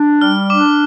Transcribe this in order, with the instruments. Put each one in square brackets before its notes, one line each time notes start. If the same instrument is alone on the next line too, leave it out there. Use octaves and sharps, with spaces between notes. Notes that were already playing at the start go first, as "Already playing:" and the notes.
Already playing: [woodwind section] D4
[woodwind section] G3 [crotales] F6
[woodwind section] D4 [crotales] D6